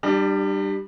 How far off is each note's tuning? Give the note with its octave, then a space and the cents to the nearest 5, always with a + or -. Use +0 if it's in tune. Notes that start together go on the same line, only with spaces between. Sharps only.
G3 +0 D4 +35